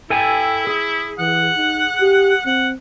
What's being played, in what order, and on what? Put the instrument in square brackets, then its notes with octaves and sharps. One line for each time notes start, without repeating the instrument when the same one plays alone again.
[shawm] E4 [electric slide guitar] A4 G5 G#5
[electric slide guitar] G#4
[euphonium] E3 [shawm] F#5
[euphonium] D#4
G4
[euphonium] C4 [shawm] F#5